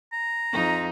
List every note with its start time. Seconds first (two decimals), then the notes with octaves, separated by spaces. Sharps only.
0.13 A#5
0.52 F2 D#4